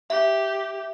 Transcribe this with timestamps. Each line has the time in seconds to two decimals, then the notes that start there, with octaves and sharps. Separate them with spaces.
0.10 G4 E5